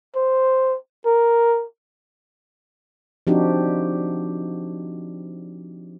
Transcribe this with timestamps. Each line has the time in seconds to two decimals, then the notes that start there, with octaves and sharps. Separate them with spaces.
0.16 C5
1.05 A#4
3.27 F3 C4 D4 D#4 F#4 G4